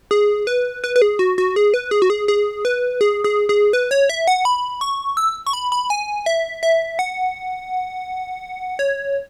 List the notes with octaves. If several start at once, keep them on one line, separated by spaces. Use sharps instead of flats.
G#4
B4
B4
B4
G#4
F#4
F#4
G#4
B4
G#4
F#4
G#4
G#4
B4
G#4
G#4
G#4
B4
C#5
E5
F#5
B5
C#6
E6
C#6
B5
B5
G#5
E5
E5
F#5
C#5